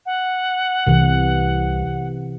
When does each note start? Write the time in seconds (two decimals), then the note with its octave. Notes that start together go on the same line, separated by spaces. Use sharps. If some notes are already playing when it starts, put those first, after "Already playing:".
0.06 F#5
0.87 C2 C3 E3